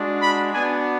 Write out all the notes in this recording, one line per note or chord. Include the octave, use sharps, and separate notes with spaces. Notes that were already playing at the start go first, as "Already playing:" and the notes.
Already playing: G#3 D4 F#4
B5
B3 D4 F#4 G#5